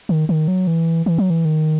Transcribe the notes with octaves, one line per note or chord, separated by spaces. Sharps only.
D#3
D#3
F#3
E3
E3
F#3
E3
D#3